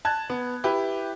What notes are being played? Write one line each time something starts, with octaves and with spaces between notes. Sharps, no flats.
A5 F#6 G#6
B3
E4 G4 B4